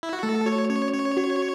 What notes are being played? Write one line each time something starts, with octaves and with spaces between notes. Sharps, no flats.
E4
F#4
A3 A4
F#4 C#5
C#4 C#5
C#4 C#5
F#4